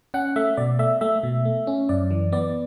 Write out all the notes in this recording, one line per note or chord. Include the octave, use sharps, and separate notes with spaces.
C#4 F#5
A3 E5
B2 D5
A3 E5
A3 E5
B2
A3
C#4
F#2 D5
E3
B3 D5